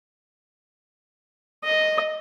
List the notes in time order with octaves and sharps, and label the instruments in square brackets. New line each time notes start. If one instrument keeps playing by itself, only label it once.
[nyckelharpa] D#5